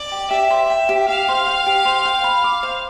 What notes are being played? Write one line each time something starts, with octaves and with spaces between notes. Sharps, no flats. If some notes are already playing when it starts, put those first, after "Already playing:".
Already playing: D5
G4
G4 E5
C5
G5
G4
G4 F5
C5
G5
G4
C5
G5
B5
D6
C5